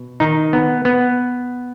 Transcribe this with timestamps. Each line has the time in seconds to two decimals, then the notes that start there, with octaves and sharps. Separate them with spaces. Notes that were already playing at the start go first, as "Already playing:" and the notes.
Already playing: B2
0.20 D#3 D#4
0.53 B3
0.85 B3